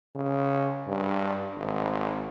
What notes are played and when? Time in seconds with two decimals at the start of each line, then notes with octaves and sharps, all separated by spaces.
0.15 C#3
0.87 G2
1.57 G#1